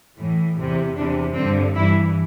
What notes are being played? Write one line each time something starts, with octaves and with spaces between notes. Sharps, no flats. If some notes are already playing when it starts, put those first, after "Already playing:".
A2 E3
E2 C3 E3
E2 C3 E3 D4
G2 D3 C4
G2 E3 E4